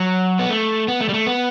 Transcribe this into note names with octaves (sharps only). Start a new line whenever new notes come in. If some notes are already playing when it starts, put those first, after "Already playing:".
Already playing: F#3
B3
A3
B3
A3
G3
A3
B3